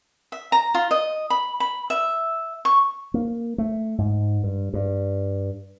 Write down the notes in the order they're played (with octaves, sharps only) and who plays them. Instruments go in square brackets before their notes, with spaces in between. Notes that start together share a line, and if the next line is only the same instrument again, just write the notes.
[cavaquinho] E5
A#5
F4
D#5
B5
B5
E5
C#6
[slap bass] A#3
A3
G#2
G2
G2